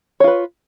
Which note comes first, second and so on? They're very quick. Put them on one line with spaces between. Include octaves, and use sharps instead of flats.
C#5 F4 B4